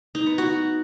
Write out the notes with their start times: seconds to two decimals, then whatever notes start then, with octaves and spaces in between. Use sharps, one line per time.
0.15 D#4
0.26 B3
0.38 F#4